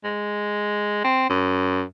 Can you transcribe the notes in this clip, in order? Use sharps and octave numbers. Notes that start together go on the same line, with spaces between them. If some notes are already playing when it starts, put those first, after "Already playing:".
G#3
C4
F#2